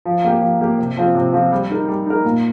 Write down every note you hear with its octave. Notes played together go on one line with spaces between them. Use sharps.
F3
A#3 G4
F3
A#3 G4
C3
F3 C4 F4
C3
F3 C4 F4
G3
D#4 A#4
G3
D#4 A#4
A#2